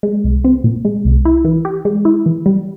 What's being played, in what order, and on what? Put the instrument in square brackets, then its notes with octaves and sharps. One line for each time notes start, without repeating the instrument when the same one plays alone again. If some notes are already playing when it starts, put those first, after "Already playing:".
[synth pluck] G#3
C2
C4
A#2
G#3
C2
E4
E3
G4
G#3
E4
E3
G3